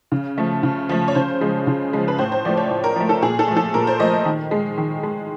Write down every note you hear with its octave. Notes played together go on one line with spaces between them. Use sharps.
C#3
F3 A3
C#3
F3 A3
C#5
C#3 C5
F3 G#3
C#3
F3 G#3
B4
A2 C5
C5
F3 A3 D5
C#5
A2
A#4
F3 A3
A4
A#2 G#4
A4
F3 A3
A4
A#2 A#4
C5
F3 A3 D#5
D#3
G#3
D#3
G#3